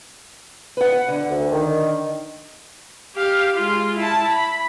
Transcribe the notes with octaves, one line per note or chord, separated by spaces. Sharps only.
B4 F#5
D3
D2
D#3
G4 F5
G#3 F4
E4 A5
B5